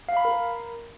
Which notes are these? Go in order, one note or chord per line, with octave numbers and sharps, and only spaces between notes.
F5
B5
A#4